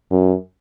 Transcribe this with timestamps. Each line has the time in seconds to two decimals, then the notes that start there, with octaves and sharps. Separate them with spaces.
0.11 F#2